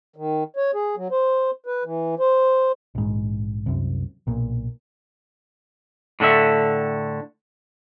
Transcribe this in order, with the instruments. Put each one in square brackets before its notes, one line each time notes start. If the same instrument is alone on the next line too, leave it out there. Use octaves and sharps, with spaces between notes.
[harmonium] D#3
C#5
G#4
F#3
C5
B4
E3
C5
[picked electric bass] A#1 G#2
C2 F#2
B1 A#2
[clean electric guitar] A2 D3 A4 E5